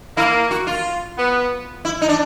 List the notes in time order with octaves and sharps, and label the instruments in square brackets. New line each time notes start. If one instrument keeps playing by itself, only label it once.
[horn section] A#3 [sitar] E4
[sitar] F#4
F4
[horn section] B3
[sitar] E4
D#4
D4